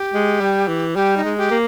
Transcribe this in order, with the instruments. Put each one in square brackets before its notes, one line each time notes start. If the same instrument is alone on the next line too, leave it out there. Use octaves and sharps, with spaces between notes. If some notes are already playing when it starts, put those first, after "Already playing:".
Already playing: [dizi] G4
[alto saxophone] G#3
G3
E3
[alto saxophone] G3 [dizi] G4
[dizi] D#4
[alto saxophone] G#3
[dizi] G4
[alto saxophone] A#3